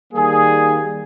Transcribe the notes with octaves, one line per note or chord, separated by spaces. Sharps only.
D#3 G3 A#3 G#4